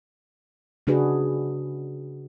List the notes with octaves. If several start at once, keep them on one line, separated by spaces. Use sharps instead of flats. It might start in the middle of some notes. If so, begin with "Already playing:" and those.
C#3 D4 F#4 G#4 B4